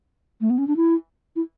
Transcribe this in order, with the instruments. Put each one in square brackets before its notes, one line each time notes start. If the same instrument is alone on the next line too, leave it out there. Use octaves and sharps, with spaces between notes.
[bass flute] A3
B3
C#4
D4
E4
E4